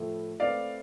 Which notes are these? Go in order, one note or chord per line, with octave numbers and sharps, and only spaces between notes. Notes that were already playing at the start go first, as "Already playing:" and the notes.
Already playing: A2 F3 A3 E4 A4
A3 C4 E4 B4 D5 F5